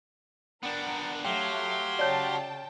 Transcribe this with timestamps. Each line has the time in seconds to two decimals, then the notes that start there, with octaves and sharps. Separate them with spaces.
0.63 B3 D4 A#4 D5 F#5 G5
1.25 F#3 A3 G4 F5 G5 C6
1.99 C#3 C#5 D5 G5 A5